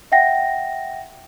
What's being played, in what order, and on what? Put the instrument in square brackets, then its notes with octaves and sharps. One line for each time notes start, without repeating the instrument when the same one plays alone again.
[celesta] E5 F#5 G5 A#6